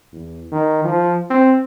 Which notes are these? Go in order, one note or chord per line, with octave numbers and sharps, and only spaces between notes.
E2
D#3
F3
C4